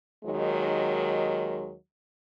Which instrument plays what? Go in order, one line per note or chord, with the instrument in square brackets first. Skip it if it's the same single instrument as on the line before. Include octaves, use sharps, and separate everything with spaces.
[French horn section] D#2 D#3 F#3 G#3